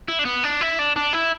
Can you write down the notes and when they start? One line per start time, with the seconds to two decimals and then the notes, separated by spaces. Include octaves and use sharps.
0.08 E4
0.19 D4
0.25 B3
0.44 D4
0.61 E4
0.79 D4
0.96 D4
1.13 E4